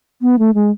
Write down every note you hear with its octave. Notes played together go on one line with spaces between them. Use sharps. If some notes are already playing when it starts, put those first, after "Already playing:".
B3
A3
G#3